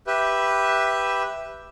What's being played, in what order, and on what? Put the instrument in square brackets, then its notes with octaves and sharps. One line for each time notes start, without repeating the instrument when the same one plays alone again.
[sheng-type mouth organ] G4 B4 E5